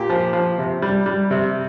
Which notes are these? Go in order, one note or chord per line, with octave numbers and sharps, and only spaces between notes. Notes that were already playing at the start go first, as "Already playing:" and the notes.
Already playing: A#2 G4
F3
F3
C3
G3
G3
C3